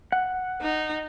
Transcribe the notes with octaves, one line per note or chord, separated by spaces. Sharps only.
F#5
D#4